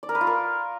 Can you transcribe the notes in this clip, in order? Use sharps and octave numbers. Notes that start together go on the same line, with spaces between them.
D5
A#4
B4
F4
A#4